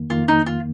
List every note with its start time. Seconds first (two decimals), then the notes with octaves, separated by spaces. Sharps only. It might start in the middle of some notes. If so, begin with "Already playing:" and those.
Already playing: F2 D#3 A#3
0.10 F2 D#3 A#3 F4
0.28 D#4
0.46 F4